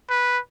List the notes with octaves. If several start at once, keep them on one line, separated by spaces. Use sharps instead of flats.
B4